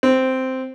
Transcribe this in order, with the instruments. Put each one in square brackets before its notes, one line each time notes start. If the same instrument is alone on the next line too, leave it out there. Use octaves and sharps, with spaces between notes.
[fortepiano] C4